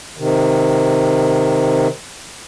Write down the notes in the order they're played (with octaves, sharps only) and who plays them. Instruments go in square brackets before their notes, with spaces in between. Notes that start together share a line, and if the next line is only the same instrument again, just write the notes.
[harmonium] C3 D#3